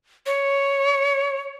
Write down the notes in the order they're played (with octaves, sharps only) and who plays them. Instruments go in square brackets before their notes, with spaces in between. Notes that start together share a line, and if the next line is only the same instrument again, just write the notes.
[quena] C#5